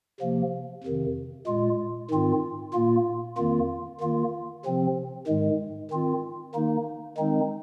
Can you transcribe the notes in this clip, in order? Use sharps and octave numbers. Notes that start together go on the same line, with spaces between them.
C3 F3 A#3
F2 C3 D#3
A#2 G#3 F4
G#2 D#3 C4 F4
A#2 A#3 F4
F2 D#3 A#3 F4
D#3 A#3 F4
C3 F3 C4
G#2 D#3 G#3
D#3 C4 F4
D#3 A#3 D#4
D#3 G#3 C4 D#4